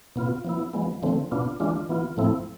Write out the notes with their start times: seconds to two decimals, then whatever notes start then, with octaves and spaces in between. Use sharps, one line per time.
0.16 B2 B3 F4
0.45 F3 B3 E4
0.73 F3 G#3 B3
1.02 D3 F3 A3 C4
1.31 B2 B3 D4 F4
1.60 E3 G#3 D4 F4
1.89 E3 B3 F4
2.17 A2 F3 A3 C4 E4